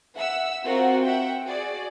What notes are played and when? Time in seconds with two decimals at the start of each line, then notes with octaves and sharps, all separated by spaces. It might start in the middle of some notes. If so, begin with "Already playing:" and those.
0.16 E5 F#5 E6
0.65 C4 F4 F#4 A#4 C5 F#5
1.04 E5 F#5 G5
1.43 F#4 G#4 D5